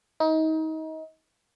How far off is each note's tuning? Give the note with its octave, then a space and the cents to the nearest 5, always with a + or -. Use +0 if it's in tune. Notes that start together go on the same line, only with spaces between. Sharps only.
D#4 +30